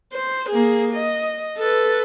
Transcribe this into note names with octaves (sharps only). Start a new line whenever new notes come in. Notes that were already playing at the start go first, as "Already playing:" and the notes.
C5
A#3 G#4
D#5
A4 B4